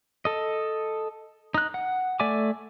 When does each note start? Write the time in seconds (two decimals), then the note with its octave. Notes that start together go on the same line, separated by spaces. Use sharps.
0.25 A4 D#5
1.54 D#4 F#6
1.74 F#5
2.20 A3 D5 E5 G#5 D6